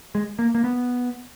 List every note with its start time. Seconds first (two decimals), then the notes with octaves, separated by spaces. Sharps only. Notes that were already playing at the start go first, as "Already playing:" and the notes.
0.15 G#3
0.39 A#3
0.55 A#3
0.64 B3